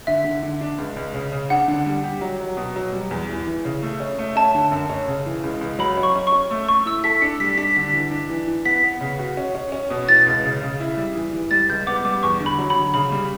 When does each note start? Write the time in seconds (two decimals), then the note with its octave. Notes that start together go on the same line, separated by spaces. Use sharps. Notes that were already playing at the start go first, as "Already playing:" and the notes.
0.07 D3 E5
0.24 D3
0.43 D3
0.61 D4
0.78 C#2
0.97 C#2
1.14 C#3
1.32 C#3
1.50 D4 F#5
1.68 D3
1.86 G3
2.04 G4
2.21 F#3
2.40 F#3
2.57 B2
2.76 F#3
2.93 G3
3.11 E2
3.29 E3
3.47 E3
3.65 C#3
3.83 A3
4.00 C#4
4.18 A3
4.36 C#4 A5
4.55 D3
4.72 F#2
4.89 C#4
5.08 C#3
5.26 E3
5.44 C#2
5.61 C#2
5.79 F#3 B5
5.97 C#4
6.03 C#6
6.16 C#4
6.27 C#6
6.32 C#4
6.51 A3
6.68 A3 C#6
6.86 E4 E6
7.04 A4 B6
7.22 D4 C#7
7.40 G3 B6
7.58 D4 B6
7.76 D3 B6
7.93 E3
8.11 D4
8.29 E3
8.47 E3
8.65 B3 B6
8.83 B3
9.01 C#3
9.19 F#4
9.37 C#4
9.55 C#4
9.72 C#4
9.90 B2
10.08 E3 A6
10.26 C#2
10.44 C#3
10.62 C#3
10.80 E4
10.97 G3
11.16 E3
11.33 E3
11.51 G3 A6
11.69 C#2 G6
11.87 B3 D6
12.05 G3 D6
12.23 E2 C#6
12.40 D3
12.46 B5
12.59 F#3
12.70 B5
12.76 D3
12.94 C#3 B5
13.12 G3